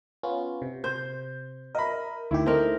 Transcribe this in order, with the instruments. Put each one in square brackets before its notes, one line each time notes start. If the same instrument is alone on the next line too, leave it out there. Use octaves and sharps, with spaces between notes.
[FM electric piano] B3 C#4 F4
C3
[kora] C5 [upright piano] G6
[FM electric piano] A#4 [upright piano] D#5 E5 B5
[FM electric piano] D2 D#3 G4 [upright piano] E4
[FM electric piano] A3 D#4 [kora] C4 A#4